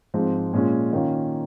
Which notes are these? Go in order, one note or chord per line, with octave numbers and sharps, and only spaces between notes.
G#2 F3 C4
A#2 G#3 C#4 F4
D#3 A#3 C#4 F4